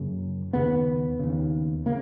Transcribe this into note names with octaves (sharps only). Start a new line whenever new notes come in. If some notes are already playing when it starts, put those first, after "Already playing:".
Already playing: F#2 C#3 A#3
D#2 C#3 B3
D#2 C#3
C#3 A#3